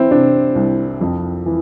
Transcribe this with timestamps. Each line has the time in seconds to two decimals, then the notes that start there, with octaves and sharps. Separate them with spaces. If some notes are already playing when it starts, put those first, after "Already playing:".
Already playing: E3 C4 E4
0.11 C3 D4
0.55 C2
1.01 F2
1.46 E3